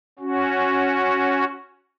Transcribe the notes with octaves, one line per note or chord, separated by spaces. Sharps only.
C#4 F#4